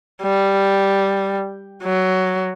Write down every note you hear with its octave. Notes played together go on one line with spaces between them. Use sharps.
G3
F#3